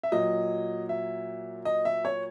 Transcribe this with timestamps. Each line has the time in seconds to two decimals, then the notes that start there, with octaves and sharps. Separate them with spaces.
0.03 E5
0.12 A#2 F#3 D#5
0.89 E5
1.65 D#5
1.85 E5
2.05 C#5